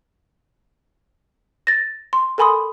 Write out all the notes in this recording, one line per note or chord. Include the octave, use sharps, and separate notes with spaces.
A6 A#6
C6
A4 A#4 G#5 B5 C6 D#6